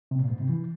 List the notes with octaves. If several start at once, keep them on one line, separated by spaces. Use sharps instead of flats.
C3
A#2
G#2
C3
E3